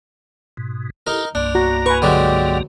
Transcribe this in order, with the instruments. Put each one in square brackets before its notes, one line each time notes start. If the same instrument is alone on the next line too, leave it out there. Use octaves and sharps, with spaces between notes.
[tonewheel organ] G#2 B2
[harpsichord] D#4 A#4 [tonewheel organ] E4 G4 A4
[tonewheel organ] C2 G2 A#3 [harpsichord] D4
[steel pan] F#4 [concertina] A#5
[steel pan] B4 G#5 [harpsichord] C#6
[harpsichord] D3 F#3 G#3 [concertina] G4 D5